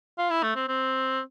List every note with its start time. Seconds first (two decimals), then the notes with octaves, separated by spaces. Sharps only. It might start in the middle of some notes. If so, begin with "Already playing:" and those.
0.18 F4
0.30 E4
0.43 A3
0.56 C4
0.68 C4